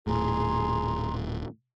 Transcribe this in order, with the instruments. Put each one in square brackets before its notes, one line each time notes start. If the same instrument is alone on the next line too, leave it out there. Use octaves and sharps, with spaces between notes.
[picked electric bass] D#1 A2 [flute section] G#4 A#5 C6